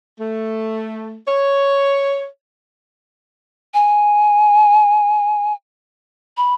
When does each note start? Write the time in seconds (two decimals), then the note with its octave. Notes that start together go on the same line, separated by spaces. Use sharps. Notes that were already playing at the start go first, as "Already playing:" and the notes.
0.19 A3
1.27 C#5
3.74 G#5
6.37 B5